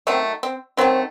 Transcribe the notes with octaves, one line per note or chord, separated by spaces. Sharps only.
D#3 F#3 A3 C4
C4
D#3 F#3 A3 C4